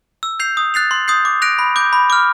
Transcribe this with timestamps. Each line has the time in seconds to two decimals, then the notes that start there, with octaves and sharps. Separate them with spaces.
0.23 E6
0.40 G6 C7 F7
0.57 D#6
0.74 F#6 A6 C7 F7
0.91 C6
1.08 D#6 G6 C7
1.25 D6
1.42 F#6 A#6 D7 F7
1.59 B5
1.76 D6 G6
1.93 B5
2.10 D6 F6